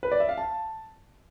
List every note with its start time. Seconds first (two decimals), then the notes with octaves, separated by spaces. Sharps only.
0.03 B4
0.12 D5
0.20 E5
0.29 F5
0.38 A5